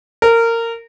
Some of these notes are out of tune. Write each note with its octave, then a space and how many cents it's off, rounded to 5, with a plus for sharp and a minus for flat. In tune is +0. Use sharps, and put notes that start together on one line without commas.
A#4 -20